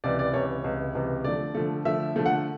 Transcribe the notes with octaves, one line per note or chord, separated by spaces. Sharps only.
C#2 C3 E3 D5
D5
C#2 C3 E3 C#5
C#2 C3 E3
C#2 C3 E3
D3 F3 A3 D5
D3 F3 A3
D3 F3 A3 E5
D3 F3 A3
F#5